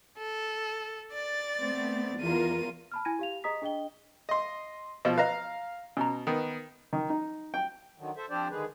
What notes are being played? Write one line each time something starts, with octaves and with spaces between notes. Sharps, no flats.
A4
D5 A6
A3 B3 C4
E2 F4 A#4 D#7
A5 B5 F6
E4 G#5 G#6 A#6 D#7
G4 F5 F7
G#4 D#5 A#5 D#6 B6
D4 G#4 D#5 G5 G7
D#5 C6
B2 F3 D#5
B4 D#5 F5 A#5
B2 C#4 A#5
D#3 B3
D#3
D#4
G5
D3 D#3 F#3
A4 C5 E5
F3 C4 D4 G4 C5 D5
D3 D#3 G#3 G#4 B4